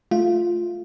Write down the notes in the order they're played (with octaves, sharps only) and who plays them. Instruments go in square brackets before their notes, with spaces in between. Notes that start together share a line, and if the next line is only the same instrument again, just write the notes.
[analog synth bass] A3 [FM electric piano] F4